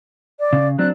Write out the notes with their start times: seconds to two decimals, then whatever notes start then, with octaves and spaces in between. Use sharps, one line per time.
0.40 D5
0.53 C#3
0.79 F#3 C4 D4 F#6